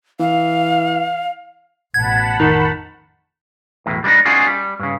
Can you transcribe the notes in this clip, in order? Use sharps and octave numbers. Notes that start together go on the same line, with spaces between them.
E3 F5
A1 B2 F#5 A5 B5 G#6
F2 D#3 D#4
B1 E2 A2
G3 G#3 C4 D4 D#4
C#4 D#4 F4 F#4 G#4 D5
G3
G2 C#3